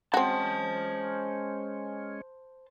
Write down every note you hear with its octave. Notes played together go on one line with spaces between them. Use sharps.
G#3 C4 C#4 F#4 C5 A5